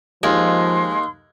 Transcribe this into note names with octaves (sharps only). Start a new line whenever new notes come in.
D#2 F3 G#3 C6